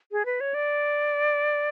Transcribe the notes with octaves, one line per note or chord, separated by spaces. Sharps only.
G#4
B4
C#5
D5